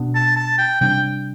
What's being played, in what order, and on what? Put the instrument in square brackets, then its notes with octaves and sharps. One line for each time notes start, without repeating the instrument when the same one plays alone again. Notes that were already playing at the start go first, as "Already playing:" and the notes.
Already playing: [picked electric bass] B2 B3 D4
[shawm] A5
A5
G5
[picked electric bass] C3 G3 D4 [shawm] G5